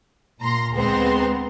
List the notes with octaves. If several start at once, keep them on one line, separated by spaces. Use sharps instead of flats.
A#2 A#5 C6
D2 G#3 B3 C4 A#5 C6